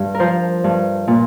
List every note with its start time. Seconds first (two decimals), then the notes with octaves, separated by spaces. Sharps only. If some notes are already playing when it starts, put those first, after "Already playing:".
Already playing: G2
0.15 A#4
0.20 F3 C5
0.64 G2
1.08 A#2